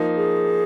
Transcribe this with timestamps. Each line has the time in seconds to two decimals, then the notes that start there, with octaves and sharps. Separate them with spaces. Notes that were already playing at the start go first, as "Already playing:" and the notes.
Already playing: F3 A#3 D#4
0.17 G#4